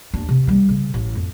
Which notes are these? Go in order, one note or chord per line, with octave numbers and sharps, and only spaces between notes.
D#2 D4
C3
G3 A#3
C#3
A1
F2